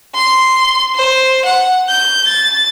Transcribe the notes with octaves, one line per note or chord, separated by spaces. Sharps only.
C6
C5
F#5
G6
A6